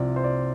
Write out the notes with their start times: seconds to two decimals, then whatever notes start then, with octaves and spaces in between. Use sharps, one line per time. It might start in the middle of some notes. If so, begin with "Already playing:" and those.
Already playing: C2 C3 F3 D5
0.16 C5
0.24 D5